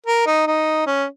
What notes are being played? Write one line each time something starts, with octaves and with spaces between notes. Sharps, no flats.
A#4
D#4
D#4
C#4